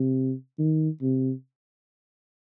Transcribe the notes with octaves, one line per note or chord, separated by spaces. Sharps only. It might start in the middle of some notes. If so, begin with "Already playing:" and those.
Already playing: C3
D#3
C3